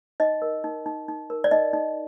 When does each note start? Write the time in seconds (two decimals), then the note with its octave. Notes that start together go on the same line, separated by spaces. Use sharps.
0.20 D#4 D#5
0.42 A#4
0.64 D#4
0.86 D#4
1.08 D#4
1.30 A#4
1.44 D5
1.51 D#4 D#5
1.73 D#4